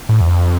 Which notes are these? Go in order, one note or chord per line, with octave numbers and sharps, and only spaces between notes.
A2
E2
F2